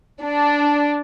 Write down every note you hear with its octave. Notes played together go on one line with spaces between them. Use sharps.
D4